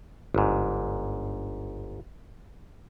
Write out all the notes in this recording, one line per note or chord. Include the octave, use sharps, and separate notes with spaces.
G1 G#2